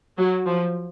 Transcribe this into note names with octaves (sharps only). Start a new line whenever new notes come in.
F#3
F3